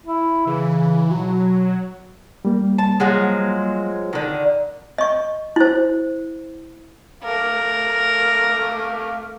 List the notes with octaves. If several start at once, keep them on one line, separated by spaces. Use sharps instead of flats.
E4
C#3 E3
B2 F#3
G3 A#3
A5
F3 F#3 G#3
D3 D#3
D#5 C#6
E4 C5
A3 A#4 F5 D6